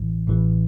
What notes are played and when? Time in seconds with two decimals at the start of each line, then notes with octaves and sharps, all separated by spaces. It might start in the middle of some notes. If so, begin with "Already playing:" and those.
Already playing: A1 A2 E3
0.26 A1 A2 E3